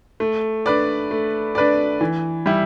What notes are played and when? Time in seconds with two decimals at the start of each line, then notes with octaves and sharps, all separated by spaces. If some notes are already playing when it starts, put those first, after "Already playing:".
0.20 A3
0.66 D4 B4 D5
1.11 A3
1.55 D4 B4 D5
2.01 E3
2.46 G3 E4